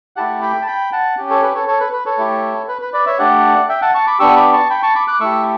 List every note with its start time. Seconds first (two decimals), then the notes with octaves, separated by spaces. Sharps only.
0.16 A3 E4 G4 F#5 A5
0.42 G5 B5
0.61 A5
0.67 G5 B5
0.92 F#5 A5
1.18 C#4 G4
1.30 A4 C#5
1.43 B4
1.55 A4 C#5
1.67 A4 C#5
1.80 B4
1.93 B4
2.06 A4 C#5
2.18 A3 E4 G4
2.68 B4
2.82 B4
2.93 B4 D5
3.06 C#5 E5
3.19 A3 D4 G4 D5 F#5
3.69 E5 G5
3.82 F#5 A5
3.94 A5 C#6
4.06 B5 D6
4.20 B3 D4 G4 C#6 E6
4.36 B5 D6
4.53 A5 C#6
4.70 G5 B5
4.83 A5 C#6
4.95 B5 D6
5.08 D6 F#6
5.20 A3 E4 G4 C#6 E6